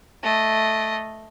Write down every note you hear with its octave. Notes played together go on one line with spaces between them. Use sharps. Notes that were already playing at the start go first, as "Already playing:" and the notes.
A3 D#5